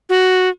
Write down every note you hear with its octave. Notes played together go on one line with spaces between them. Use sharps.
F#4